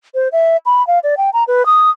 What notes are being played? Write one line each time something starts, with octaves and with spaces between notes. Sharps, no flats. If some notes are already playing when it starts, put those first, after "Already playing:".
C5
E5
B5
F5
D5
G5
A#5
B4
D#6